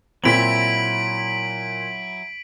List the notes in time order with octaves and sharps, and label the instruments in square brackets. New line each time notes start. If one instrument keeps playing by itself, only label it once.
[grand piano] A#2 C4 [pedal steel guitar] F#3 E4 [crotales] B6 D7 F#7